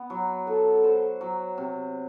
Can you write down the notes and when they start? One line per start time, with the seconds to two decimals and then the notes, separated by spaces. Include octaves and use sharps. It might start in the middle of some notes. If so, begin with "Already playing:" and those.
Already playing: B3
0.10 F#3
0.47 F#4 A4
0.84 C5
1.21 F#3
1.58 C3